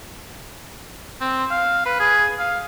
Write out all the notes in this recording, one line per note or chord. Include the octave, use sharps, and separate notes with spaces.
C4
F5
B4
G#4
F5